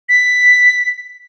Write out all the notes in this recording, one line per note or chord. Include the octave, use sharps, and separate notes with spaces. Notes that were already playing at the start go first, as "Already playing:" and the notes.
B6